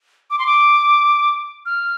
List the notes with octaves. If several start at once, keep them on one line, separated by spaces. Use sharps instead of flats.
D6
C6
D6
F6